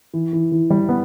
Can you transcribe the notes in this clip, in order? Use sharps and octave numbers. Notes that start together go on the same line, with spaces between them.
E3
E3
E3
G3
B3